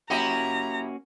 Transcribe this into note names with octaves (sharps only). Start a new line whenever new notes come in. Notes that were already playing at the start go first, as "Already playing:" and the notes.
A#3 C#4 E4 F#4 G4 D#5 A#5